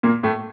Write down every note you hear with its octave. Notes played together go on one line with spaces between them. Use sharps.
A#2 A#3
A2 A3